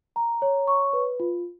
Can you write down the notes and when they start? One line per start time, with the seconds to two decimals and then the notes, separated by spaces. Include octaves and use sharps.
0.16 A#5
0.42 C#5
0.67 C#6
0.93 B4
1.20 F4